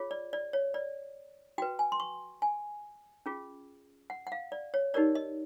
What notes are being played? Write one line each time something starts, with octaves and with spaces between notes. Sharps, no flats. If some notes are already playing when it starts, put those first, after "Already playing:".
Already playing: F4 G#4 C#5
D5
D5
C#5
D5
F#4 B4 G5
G#5
C6
C#6
G#5
C#4 F4 G#4
F#5
F#5
F5
D5
C#5
D#4 G4 A#4 C#5 D5
D#5